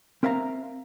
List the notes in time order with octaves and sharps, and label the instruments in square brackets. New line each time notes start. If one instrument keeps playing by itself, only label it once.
[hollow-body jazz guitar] C4 A#4 E5 F5 A5 A#5